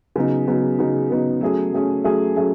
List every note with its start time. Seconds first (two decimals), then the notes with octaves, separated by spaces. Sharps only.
0.16 C#3 F#3 B3 D#4
0.47 C#3 F#3 B3 D#4
0.79 C#3 F#3 B3 D#4
1.10 C#3 F#3 B3 D#4
1.41 F#3 A3 C#4 G#4
1.72 F#3 A3 C#4 G#4
2.04 F#3 A3 C#4 G#4
2.36 F#3 A3 C#4 G#4